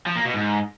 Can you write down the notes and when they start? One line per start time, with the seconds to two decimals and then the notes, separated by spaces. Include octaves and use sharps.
0.07 F3
0.16 A#3
0.25 B2
0.34 G#2